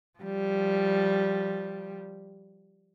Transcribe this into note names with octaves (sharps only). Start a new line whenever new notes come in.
F3 G3